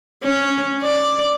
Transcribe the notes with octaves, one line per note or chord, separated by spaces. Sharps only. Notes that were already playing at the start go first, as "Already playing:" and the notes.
C#4
D5